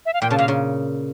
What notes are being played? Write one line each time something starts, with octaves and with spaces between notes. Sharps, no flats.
E5
F5
A#2 G5
C#3 A5
A#2 F5
C#3